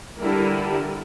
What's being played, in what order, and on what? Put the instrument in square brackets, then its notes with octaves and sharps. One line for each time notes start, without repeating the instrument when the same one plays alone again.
[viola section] D3 G3 E4 A#4